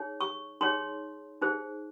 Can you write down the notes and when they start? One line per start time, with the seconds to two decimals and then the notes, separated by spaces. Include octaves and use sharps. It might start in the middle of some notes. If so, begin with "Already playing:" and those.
Already playing: D#4 G#4 C#5
0.21 C#6
0.61 D#4 G#4 C#5 C6
1.42 D#4 G#4 C5